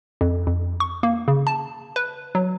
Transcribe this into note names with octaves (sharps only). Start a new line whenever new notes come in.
F2
F2
C#6
A#3
C#3
A5
B4
F#3